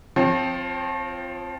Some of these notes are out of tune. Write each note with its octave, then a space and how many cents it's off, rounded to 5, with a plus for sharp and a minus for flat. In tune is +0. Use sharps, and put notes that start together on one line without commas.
F3 +0 C4 +0 C#5 -40